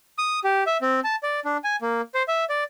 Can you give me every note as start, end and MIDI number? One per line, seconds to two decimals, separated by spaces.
0.18 0.40 87
0.44 0.64 67
0.67 0.77 76
0.81 1.00 60
1.04 1.16 81
1.23 1.40 74
1.45 1.57 62
1.64 1.76 80
1.82 2.01 58
2.14 2.23 72
2.28 2.45 76
2.49 2.64 74